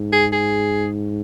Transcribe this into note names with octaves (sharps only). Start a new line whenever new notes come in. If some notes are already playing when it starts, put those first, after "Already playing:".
Already playing: G#2
G#4
G#4